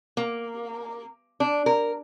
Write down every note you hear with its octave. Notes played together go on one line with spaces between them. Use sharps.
A#3
D4
A#4